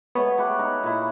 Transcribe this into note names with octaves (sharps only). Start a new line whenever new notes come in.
G#3 A3 B3 C#5
A3 G4 B4
D#4
A#2 E4